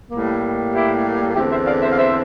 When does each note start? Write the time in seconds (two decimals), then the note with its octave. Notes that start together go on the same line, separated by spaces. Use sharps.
0.11 A2 G3 A#3
0.73 E4 G4
1.35 E2 D3 A3 C4 E4 G4
1.51 C5 E5
1.66 D5 F5
1.82 C5 E5
1.92 F5
1.98 C5 E5